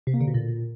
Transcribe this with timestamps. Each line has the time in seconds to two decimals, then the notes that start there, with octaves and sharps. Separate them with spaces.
0.07 C3
0.14 A#3
0.21 D3
0.27 B2
0.34 A#2